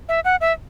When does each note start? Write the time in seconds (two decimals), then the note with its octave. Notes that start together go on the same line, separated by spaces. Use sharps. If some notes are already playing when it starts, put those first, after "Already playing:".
0.09 E5
0.25 F#5
0.41 E5